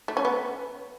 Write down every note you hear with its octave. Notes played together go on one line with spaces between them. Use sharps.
A3
C#4
B3